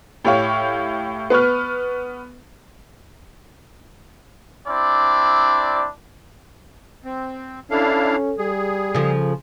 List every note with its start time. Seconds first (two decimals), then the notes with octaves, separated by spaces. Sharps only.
0.24 A2 G4 C#5 F5
1.30 B3 B4 C#6 F6
4.68 C4 D4 E4 D5
7.05 C4
7.70 C#4 D4 E4 A4 F5
8.39 G3 G#4
8.95 C#3 F3 A4